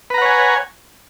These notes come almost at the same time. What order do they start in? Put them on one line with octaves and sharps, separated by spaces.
B4 A#5 F#5 C#5 G#5